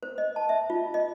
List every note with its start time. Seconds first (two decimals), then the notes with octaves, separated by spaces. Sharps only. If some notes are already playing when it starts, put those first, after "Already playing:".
0.03 C5
0.18 D#5
0.36 A5
0.49 E5
0.70 F4
0.94 D#5